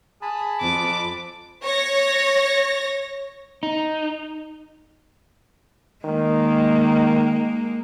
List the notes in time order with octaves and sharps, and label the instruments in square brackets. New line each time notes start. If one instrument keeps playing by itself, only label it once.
[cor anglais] G#4 [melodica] A5 B5
[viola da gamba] F2 [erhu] D6
[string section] C#5 A#6
[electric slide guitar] D#4
[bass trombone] D#3 [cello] G#3 A#3